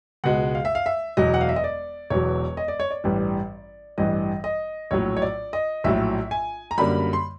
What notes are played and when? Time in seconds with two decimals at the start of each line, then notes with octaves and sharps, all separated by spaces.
0.24 C#2 B2 G#3 F#5
0.55 F5
0.65 E5
0.75 F5
0.86 E5
1.17 E1 E2 B2 F#3 D#5
1.34 F#5
1.41 F5
1.49 E5
1.56 D#5
1.64 D5
2.10 E1 E2 B2 F#3 C#5
2.57 D#5
2.68 D5
2.80 C#5
2.91 D5
3.04 A1 G2 E3 G3
3.98 A1 G2 E3 G3 D#5
4.44 D#5
4.91 A#1 A2 F#3 C#5
5.17 C#5
5.22 D5
5.53 D#5
5.84 A#1 A2 F#3 E5
6.31 G#5
6.71 A#5
6.78 F#2 D3 G3 A#3 B5
7.13 C6